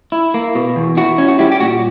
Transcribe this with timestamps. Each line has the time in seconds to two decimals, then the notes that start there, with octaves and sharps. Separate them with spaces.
0.12 E4
0.34 A#3
0.55 B2
0.76 E2
0.97 E4 F#4
1.18 C#4
1.28 F#4
1.39 G3 E4 G4
1.52 G4
1.60 A#2 F#4